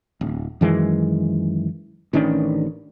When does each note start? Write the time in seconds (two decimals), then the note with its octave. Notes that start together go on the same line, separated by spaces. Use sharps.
0.21 D1
0.61 F#2 D#3 E3 G#3
2.13 A1 D#3 C#4 D4